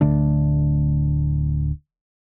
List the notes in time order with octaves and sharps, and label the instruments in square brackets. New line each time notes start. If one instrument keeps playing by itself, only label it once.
[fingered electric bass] D1 D3 A3 D4